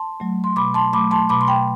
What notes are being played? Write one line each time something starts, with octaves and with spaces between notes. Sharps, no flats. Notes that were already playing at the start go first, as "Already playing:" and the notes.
Already playing: A5 C6
F#3 A3
C6
B2 B5 D6
A5 C6
F#3 A3 B5 D6
A5 C6
B2 B5 D6
C6
G5 B5